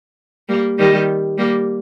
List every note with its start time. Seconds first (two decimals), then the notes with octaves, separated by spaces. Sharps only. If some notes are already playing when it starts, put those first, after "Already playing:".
0.48 G3 A#3
0.78 D#3 G3
1.38 G3 A#3